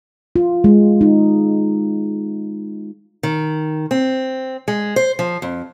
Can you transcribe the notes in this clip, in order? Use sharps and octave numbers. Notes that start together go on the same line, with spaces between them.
F4
G#3
D#4
D#3
C4
G#3
C5
F3
F2